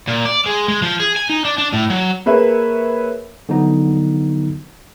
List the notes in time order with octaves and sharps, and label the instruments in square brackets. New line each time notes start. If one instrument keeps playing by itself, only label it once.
[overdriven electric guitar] A#2
D5
G#3
G#3
F3
G#4
G#5
D#4
D4
D4
A2
F#3
[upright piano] A#3 G#4 B4 C#5 E5
[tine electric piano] D3 F3 F#3 B3 D#4